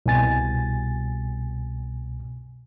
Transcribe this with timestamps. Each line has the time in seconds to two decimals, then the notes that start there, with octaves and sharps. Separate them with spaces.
0.06 C2 B2 G#5 A6